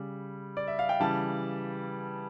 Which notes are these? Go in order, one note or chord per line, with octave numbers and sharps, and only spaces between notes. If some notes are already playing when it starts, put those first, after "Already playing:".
Already playing: C#3 G3
D5
E5
F5
G5
C#3 E3 G3 A5